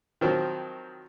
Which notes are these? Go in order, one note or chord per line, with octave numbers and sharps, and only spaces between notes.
D#3 F3 F#3 C4